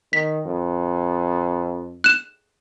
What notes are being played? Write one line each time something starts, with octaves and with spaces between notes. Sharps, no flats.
D#3 B6
F2
F#6 E7